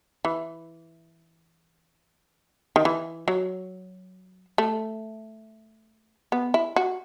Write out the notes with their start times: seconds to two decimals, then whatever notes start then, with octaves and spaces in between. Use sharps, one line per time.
0.25 E3
2.76 D#3
2.85 E3
3.28 F#3
4.58 A3
6.32 B3
6.54 E4
6.76 F#4